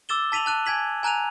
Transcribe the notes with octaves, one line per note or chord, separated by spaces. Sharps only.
D6 E6 A6 E7 G7
A5 B6 D#7 F7 F#7
A5 F#6 D#7
G#5 G#6 B6 F#7
G#5 A#5 F#6 D#7 F7